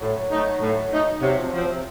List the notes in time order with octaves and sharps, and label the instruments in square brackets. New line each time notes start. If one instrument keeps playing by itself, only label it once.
[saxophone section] A2 [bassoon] F#3
[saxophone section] A3 D#4
A2
A3 D#4
[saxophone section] C3 [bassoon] F#3
[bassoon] F3
[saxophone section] F3 C4 [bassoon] F#3
[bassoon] C3